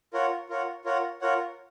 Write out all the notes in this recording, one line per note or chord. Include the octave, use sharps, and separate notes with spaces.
F4 A#4 C#5 F#5
F4 A#4 C#5 F#5
F4 A#4 C#5 F#5
F4 A#4 C#5 F#5